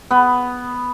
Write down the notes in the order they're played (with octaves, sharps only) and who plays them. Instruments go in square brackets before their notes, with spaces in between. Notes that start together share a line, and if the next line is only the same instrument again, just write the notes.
[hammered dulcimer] B3